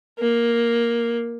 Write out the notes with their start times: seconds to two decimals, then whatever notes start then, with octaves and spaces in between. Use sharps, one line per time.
0.19 A#3